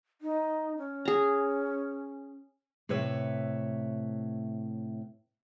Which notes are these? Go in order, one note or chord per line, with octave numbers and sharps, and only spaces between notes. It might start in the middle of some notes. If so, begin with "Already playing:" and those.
D#4
C#4
G#4 A#5
A2 C3 B4 C#5 E5